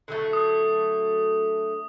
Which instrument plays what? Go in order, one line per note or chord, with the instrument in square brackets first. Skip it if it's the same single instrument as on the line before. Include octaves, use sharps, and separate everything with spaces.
[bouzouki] D3 F#3 A3
[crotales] D#6